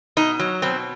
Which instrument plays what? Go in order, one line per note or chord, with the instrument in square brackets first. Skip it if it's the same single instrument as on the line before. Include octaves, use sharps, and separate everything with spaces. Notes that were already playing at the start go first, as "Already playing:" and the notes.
[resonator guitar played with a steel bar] B2 D#4
F#3
B2 C4